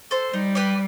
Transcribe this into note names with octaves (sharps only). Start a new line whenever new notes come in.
A4 C5
G3 D#4
G4 B4 D5